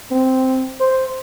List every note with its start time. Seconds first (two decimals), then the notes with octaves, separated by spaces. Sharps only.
0.12 C4
0.80 C5